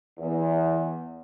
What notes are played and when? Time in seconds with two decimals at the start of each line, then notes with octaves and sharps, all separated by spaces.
0.18 E2